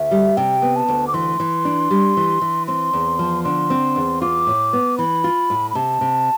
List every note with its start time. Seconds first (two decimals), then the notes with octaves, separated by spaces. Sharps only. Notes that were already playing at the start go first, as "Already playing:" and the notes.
Already playing: D2 E5
0.11 G3
0.37 C3 G5
0.62 B3
0.76 A5
0.88 D2
1.07 D6
1.14 E3 C6
1.40 E3
1.65 D4
1.91 G3
2.17 E3
2.41 E3
2.67 C4 C6
2.93 E2
3.19 F3
3.44 D3 C6
3.70 C4
3.96 E2
4.22 F4 D6
4.47 A2
4.73 B3
4.98 E3 B5
5.24 F4
5.50 A2
5.71 B5
5.75 C3 A5
6.01 C3